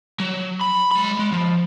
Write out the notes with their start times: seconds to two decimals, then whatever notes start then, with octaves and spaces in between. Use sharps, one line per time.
0.20 F#3
0.61 B5
0.91 G#3 B5
1.19 G#3
1.33 F3